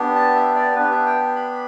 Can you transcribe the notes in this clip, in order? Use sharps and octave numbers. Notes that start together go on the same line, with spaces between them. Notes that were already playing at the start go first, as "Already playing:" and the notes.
Already playing: B3 D4 G4
A5
E5
D5
B3 D4 G4 B4
E5
G5
B5